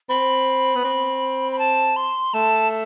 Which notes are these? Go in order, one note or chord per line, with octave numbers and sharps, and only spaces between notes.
C4 B5
B3
C4
B5
A5
C6
A3 A5